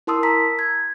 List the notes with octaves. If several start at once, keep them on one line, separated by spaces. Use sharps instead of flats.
E4 A#4 A5 C6 D#6 E6
A#5 E6 B6
G#6